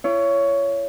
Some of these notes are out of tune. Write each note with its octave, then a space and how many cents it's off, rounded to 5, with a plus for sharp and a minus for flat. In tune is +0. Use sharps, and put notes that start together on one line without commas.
E4 +45 C#5 +15